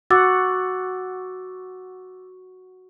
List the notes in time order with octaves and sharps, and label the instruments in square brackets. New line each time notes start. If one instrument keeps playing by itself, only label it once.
[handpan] F#4 F#5 [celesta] D6 E6 A6